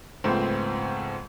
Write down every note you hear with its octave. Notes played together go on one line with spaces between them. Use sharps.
C#2 G#2 F3 A3 B3 C4